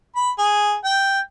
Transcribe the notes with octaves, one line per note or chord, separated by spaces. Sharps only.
B5
G#4
G5